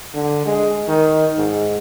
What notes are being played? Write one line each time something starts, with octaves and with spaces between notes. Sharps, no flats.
D3
G#3
D#3
G#2